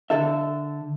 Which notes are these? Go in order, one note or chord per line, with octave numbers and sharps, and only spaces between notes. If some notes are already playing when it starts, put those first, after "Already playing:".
D3 A4 E5